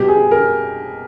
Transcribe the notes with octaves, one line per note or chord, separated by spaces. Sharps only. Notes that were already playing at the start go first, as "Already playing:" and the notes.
Already playing: B2 G3 G4
G#4
A#4